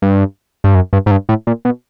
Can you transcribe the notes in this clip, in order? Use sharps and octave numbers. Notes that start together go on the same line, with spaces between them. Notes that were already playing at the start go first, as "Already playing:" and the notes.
G2
G2
F#2
G2
G#2
G2
A2
A#2
B2